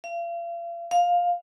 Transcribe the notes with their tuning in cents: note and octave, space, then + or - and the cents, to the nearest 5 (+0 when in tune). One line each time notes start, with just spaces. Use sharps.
F5 -40
F5 +10